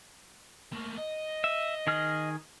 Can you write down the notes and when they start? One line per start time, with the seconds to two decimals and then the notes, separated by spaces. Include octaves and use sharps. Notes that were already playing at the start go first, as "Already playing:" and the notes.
0.73 A3 A#3
0.98 D#5
1.44 E5
1.87 D#3 G#4 F6